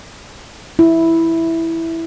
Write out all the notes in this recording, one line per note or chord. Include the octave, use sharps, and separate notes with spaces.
E4